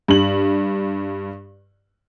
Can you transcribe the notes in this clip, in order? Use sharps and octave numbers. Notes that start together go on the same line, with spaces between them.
G2 F#7